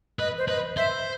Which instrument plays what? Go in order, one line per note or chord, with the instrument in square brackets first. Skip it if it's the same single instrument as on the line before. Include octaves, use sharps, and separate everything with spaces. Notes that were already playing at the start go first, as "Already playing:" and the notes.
[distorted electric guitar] B4 [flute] D#5
[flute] C5
[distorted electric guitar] B4 [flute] D#5
[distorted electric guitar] C5 [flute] E5